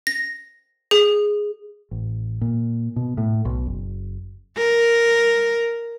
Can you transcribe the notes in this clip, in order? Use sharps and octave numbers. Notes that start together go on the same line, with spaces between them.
A#6
G#4
A1
A#2
B2
A2
B1
F#1
A#4